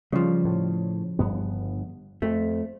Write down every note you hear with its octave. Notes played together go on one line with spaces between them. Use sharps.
C#3 F3 G3
A2
G1 G2 B3
F2 A3